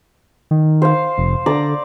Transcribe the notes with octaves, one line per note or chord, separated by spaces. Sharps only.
D#3
C5 F5
F1
D3 D5 A#5